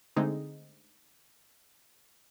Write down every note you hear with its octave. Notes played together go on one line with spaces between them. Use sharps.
D3 G#3 A3 C4 D#4